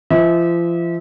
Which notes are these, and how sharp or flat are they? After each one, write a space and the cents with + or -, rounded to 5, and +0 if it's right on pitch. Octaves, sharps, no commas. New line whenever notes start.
F3 -35 E5 -35